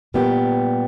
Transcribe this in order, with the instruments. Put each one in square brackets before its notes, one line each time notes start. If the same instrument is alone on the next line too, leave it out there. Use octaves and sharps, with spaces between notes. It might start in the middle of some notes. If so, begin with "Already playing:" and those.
[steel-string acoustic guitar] A#2 G3 B3 G4